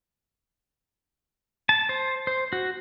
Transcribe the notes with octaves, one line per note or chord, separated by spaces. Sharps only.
A5
C5
C5
F#4